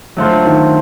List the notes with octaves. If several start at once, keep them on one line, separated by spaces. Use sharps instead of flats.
D3 F#3 A3 C4 F4
D#3